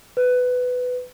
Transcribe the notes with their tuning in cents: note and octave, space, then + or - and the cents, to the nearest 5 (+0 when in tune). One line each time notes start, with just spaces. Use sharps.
B4 +15